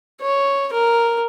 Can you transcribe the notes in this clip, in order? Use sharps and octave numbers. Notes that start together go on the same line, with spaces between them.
C#5
A#4